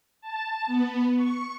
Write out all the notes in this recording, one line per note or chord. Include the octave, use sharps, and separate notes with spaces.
A5
B3
C#6